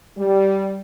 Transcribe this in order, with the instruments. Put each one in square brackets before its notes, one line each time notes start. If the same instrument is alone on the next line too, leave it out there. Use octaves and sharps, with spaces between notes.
[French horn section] G3